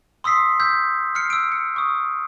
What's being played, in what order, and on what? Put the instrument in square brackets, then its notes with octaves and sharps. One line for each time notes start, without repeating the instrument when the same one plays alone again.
[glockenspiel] C6 D#6 E6 B6 C7
E6 G6 B6
F6 C7 C#7
E6 D7
C#7
C#6 D#6